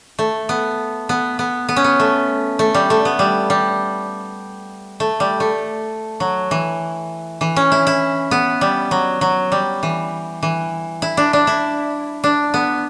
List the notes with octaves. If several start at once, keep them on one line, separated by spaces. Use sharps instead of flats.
A3
B3
B3
B3
B3
C#4
B3
A3
A3
G3
A3
B3
G3
G3
A3
G3
A3
F#3
E3
E3
C#4
E4
E4
B3
G3
F#3
F#3
G3
E3
E3
E4
D4
D4
E4
D4
B3